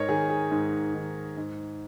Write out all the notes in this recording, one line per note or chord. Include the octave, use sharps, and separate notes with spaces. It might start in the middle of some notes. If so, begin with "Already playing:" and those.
Already playing: G#2 A#4 C#5 D#5
D#3 G#4
G#4
G#2
D#3
G#2